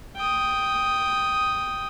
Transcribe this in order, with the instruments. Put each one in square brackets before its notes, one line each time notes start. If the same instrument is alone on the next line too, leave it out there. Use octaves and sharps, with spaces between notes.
[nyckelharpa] G5 D#6